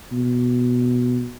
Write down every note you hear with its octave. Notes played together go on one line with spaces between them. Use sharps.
B2